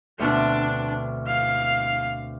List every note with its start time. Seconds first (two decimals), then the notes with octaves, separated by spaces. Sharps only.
0.19 D2 B2 C4 D4
1.27 F5